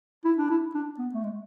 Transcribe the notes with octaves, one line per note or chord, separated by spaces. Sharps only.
E4
D4
E4
D4
B3
A3
G#3